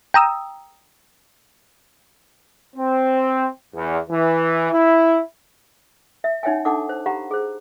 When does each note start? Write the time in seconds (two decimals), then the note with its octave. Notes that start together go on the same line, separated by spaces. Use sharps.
0.14 G5 A#5 D#6 E6
2.76 C4
3.73 E2
4.10 E3
4.71 E4
6.24 E5
6.43 C#4 D#4 C#5 E5 G5 G#5
6.65 D4 D#4 A4 F#5 A5 D6
6.89 C5
7.06 G4 F5 F#5 A#5 B5
7.31 G#4 C5